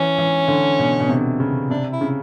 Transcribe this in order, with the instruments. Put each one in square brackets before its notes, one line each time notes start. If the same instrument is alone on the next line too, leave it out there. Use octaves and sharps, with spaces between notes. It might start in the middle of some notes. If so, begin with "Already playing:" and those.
Already playing: [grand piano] E3 [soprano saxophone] C#4
[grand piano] E3
D3
B2
B2
C3
C#3
[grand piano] C3 [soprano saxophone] D4
[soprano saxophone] E4
[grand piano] C#3